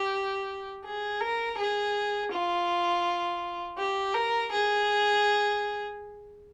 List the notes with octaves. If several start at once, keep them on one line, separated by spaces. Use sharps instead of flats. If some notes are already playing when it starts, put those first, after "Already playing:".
Already playing: G4
G#4
A#4
G#4
F4
G4
A#4
G#4